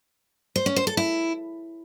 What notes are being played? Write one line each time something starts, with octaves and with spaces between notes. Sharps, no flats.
C5
C#4
C5
A4
E4